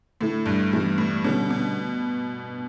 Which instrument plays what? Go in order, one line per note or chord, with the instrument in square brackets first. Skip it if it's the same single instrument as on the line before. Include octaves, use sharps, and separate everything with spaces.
[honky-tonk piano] A2 [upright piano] D3 A3 E4
[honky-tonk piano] G2
[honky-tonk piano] G2 [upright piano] E3 G3 B3 E4
[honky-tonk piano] A2
[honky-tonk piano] B2 [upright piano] D3 G3 C#4
[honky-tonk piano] B2